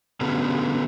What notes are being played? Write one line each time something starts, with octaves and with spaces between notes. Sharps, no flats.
B2 D3 A3 B3 C#4 G#4